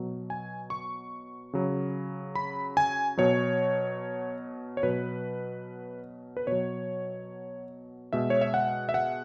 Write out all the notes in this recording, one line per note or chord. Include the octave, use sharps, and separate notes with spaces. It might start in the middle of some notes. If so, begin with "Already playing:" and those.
Already playing: B2 F#3
G#5
C#6
C#3 F#3
B5
G#5
B2 F#3 C#5
C#5
B2 F#3 B4
B4
B2 F#3 C#5
B2 G#3 E5
C#5
E5
F#5
E5
F#5